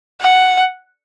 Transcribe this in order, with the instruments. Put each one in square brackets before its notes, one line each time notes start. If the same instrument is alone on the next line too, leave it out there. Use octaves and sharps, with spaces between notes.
[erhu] F#5